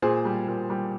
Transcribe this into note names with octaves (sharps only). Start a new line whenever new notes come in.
A#2 G#4 C5
G3
A#2
G3